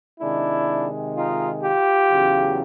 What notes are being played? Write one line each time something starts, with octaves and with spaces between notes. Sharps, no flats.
C3 D#3 G#3 D4 E4
D#4 F4
F4 G4
E2 C#3 F#3